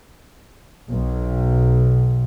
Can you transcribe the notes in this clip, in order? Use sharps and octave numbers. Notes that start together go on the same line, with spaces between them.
B1